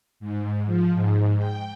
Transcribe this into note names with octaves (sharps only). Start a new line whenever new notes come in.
G#2
F3
G#2
G5